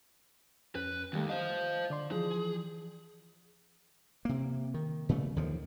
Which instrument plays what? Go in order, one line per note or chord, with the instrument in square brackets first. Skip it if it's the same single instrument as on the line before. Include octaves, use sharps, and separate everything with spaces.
[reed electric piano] F2 C#4 [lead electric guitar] B4
[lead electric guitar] D#2 [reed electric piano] D#3 G3 A3
[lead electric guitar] C5 F5 [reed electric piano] D#5
[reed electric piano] D3 D5 C6
[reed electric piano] E3 F3 [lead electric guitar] G#4
[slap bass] C3 A#3
D#3
A#2 C#3 G3 A3
D#2 D3 D#3 F3